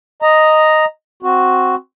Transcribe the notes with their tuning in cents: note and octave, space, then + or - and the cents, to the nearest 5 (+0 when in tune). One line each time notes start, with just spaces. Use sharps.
D#5 +0 A#5 +0
C4 +0 F#4 +0